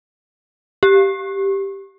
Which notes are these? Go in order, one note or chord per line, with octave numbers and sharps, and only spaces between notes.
G4